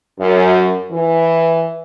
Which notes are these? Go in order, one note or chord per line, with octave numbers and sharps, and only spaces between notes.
F#2
E3